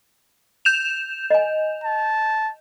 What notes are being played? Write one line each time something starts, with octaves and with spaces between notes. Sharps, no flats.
G6 E7 F7
D#5 G#5
A5